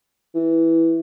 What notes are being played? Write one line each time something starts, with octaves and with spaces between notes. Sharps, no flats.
E3